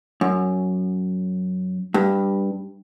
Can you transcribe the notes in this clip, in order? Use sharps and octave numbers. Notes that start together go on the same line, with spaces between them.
F#2
G2